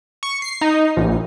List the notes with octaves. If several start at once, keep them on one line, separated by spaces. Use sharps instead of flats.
C#6
C7
D#4
A#1